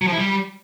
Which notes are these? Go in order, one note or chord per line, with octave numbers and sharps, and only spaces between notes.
F#3
F3
E4
G3